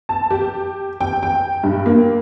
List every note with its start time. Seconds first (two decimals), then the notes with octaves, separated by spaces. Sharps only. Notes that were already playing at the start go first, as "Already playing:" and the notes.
0.09 A5
0.31 G4
1.01 G5
1.23 G5
1.63 G2
1.86 A#3